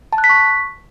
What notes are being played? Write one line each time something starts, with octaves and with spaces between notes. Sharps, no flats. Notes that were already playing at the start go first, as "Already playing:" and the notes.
A5
F#6
B6
C#6